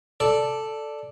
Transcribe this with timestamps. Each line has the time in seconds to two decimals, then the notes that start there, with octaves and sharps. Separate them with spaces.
0.20 A4 D5